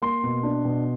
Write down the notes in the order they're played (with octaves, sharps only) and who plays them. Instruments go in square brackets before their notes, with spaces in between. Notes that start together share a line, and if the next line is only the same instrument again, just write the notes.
[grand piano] A#3 C6
B2
D4
B2